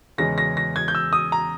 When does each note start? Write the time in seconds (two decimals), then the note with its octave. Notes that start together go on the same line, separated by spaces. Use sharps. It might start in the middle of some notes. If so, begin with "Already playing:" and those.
0.18 E2 C#3 G#3 C#4 A#6
0.38 A#6
0.57 A#6
0.76 G#6
0.88 G6
0.95 E6
1.13 D#6
1.32 A#5